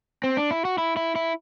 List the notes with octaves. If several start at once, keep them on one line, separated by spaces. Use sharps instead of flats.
C4
D4
E4
F#4
E4
E4
E4